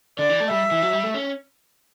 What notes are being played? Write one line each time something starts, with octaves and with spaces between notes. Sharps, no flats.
D3 D5
E3
A3
G3 E5
E3
F#3
G3
A3
C#4